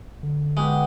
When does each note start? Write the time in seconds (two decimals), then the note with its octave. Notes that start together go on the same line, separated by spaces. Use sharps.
0.23 D3
0.57 G#3 B3 F#4 G4